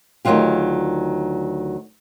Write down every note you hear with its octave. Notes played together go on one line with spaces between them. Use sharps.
D2 D#3 F3 F#3 F4 G4